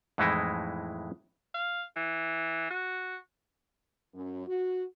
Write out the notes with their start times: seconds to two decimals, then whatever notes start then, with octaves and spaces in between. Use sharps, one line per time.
0.18 F2 A2 E3 G#3 D#4 E4
1.54 F5
1.96 E3
2.71 F#4
4.14 F#2
4.46 F#4